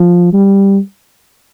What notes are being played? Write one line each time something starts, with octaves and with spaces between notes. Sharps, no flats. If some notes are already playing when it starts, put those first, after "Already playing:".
Already playing: F3
G3